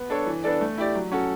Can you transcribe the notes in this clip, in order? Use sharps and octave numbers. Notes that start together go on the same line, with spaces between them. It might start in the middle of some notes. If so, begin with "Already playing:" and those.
Already playing: B3
D4 A4 C#5
E3
B3 D4 A4 D5
A3
E4 G4 D5
F#3
C#4 F#4 A4